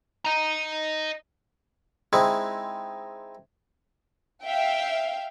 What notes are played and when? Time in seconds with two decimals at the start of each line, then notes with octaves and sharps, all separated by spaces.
0.25 D#5 A#5
2.13 G#3 C4 D#4 E4
4.44 E5 F5 G5